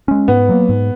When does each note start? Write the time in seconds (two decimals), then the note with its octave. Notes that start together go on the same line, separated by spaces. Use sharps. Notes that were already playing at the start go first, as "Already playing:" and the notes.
0.08 G#3 C#4
0.28 G#2 B3
0.49 F#3 A#3
0.69 G#2